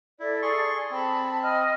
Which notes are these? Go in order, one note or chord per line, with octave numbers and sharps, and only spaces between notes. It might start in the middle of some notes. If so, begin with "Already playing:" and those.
E4 A4 D5
G#4 C6 C#6
C4 A5 B5
D#5 F6